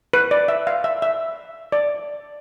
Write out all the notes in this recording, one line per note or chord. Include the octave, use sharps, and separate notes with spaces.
B4
D5
E5
F5
E5
E5
D5